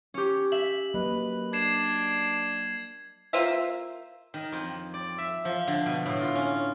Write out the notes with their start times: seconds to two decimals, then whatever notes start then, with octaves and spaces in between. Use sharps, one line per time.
0.14 C#4 G4
0.52 E5 F#7
0.94 F#3 A#3 B4 D#5
1.53 D4 G#6 C7 E7
3.33 A#3 F4 C5 E5
4.34 D#3
4.52 F2
4.94 D5
5.18 E5
5.45 F3
5.67 D3
5.86 B2
6.06 A2
6.21 F4
6.35 C#4